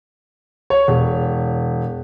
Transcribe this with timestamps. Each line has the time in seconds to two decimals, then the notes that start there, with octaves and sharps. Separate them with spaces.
0.70 C#5
0.88 E1